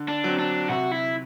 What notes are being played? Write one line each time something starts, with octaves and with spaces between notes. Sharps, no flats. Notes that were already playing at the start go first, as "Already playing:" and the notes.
Already playing: D3
D4
F#3 C4
D4
C3 F#4
E4